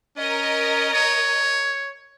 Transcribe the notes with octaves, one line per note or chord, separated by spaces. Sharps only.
C#4 A#4 D#5
C#5